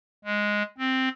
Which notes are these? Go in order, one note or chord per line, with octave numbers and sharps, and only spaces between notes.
G#3
C4